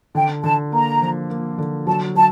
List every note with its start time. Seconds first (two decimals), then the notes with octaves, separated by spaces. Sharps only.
0.15 D3 G5
0.43 D3 A5
0.72 A#3 A#5
1.01 F3
1.30 A#3
1.58 D3
1.87 F#3 A5
2.15 F#3 A5